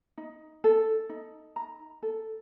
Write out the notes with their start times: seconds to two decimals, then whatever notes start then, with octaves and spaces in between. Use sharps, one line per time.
0.18 D#4
0.64 A4
1.09 D#4
1.56 A#5
2.03 A4